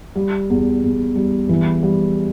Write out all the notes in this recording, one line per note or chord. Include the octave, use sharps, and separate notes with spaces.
G3
E2
E2
G3
E3
G3